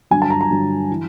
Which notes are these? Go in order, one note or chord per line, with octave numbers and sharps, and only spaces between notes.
G2 D3 F#3 G#5
A5
A#5
A#5
G2 D3 F#3
E3